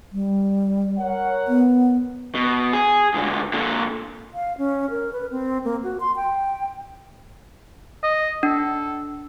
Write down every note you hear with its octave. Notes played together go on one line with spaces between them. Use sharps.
G3
A#4 C#5 F#5
B3
B2
G#4
C#2 D3
A#2 D3
F5
C#4
A#4
B4
C4
A#3
F#4
C6
G5
D#5
D4 A4